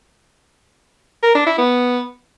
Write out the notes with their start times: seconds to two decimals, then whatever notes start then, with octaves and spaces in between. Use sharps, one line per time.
1.23 A#4
1.35 D4
1.47 E4
1.58 B3